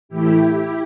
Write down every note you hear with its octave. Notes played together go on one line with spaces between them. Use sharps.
A2 E3 A3 E4 G4